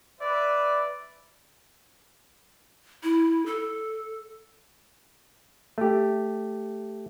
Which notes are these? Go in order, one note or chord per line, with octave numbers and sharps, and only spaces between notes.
B4 D5 E5
E4
A4
A3 G4